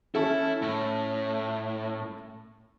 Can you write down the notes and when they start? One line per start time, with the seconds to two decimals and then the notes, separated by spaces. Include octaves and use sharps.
0.15 C#4 E4 A4
0.62 A2